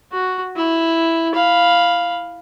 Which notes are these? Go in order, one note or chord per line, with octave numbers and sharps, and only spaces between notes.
F#4
E4
F5 B5